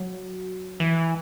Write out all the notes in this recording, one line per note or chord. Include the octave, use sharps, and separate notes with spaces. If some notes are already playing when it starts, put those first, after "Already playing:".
Already playing: F#3
E3